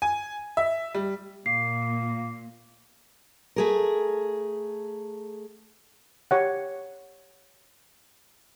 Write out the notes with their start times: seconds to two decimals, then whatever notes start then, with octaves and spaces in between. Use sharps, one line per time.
0.02 G#5
0.57 E5
0.94 G3
1.46 A#2 A#3 C7
3.56 A3 G#4 A#4
6.31 G4 C#5 F#5